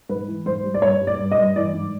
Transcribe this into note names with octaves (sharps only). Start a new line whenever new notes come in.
G#2 B4
E3
G#2 C5
G3
D5
G2 C#5
G3
D5
G2
D#5
G2
E3 D5
G#2